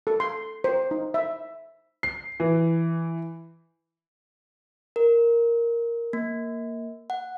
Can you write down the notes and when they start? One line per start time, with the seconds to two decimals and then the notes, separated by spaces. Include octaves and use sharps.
0.07 A4
0.20 C6
0.64 C5
0.91 D#4
1.14 E5
2.03 C7
2.40 E3
4.96 A#4
6.13 A#3
7.10 F#5